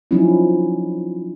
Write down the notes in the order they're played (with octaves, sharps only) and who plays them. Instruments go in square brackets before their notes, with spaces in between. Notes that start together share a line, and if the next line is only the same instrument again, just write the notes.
[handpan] F3 F#3 C#4 D#4 E4